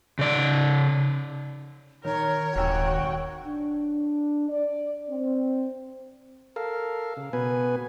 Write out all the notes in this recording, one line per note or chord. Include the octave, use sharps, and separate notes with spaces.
C#3 D5
D#3 A#4 C#5
D#1 G#1 F#4 G5 G#5 E6
D4
D5
C4
A4 A#4 F5
C#3
B2 B3 B4 G#5